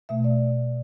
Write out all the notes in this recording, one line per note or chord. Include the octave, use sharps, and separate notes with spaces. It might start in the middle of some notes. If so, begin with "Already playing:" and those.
B2 A3 E5
D5